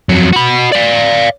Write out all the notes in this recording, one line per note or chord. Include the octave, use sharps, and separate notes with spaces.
F2 F#3
F#4 B5
D5 F5